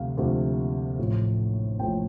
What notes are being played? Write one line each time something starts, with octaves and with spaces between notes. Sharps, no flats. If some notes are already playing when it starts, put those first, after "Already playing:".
Already playing: D2 C3 F3 F5
D2 C3 F3
A1 A2 F3
A1 A2 F3 G5